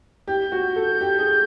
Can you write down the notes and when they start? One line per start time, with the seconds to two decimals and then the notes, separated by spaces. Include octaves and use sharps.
0.27 G4 G6
0.52 F#4
0.76 A4
1.01 G4
1.19 G#4